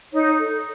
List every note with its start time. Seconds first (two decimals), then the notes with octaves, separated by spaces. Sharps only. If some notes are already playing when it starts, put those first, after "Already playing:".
0.13 D#4 C#5
0.39 A4